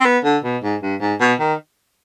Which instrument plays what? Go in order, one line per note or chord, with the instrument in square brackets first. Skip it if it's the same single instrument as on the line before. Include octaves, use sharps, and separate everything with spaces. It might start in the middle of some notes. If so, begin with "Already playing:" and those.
[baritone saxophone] C4
B3
D3
B2
G#2
G2
G#2
B2
D#3